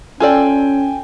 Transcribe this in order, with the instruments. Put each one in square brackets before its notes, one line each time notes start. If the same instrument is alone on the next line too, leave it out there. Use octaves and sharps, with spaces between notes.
[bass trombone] C#4 [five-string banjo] F4 A4 D5 [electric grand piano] G5 G#5